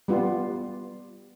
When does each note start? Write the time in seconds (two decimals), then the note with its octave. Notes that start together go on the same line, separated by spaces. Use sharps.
0.08 G3 B3 F4